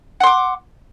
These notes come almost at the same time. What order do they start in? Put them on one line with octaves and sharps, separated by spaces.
F#5 C6 D6